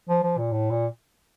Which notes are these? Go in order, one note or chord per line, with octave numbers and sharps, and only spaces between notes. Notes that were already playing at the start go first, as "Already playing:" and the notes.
F3
F3
A#2
A2
A#2